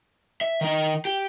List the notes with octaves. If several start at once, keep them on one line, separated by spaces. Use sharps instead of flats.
E5
D#3 D#4
G4